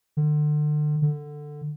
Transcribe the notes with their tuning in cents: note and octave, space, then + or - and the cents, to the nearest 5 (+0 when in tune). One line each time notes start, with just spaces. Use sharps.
D3 +35
D3 +10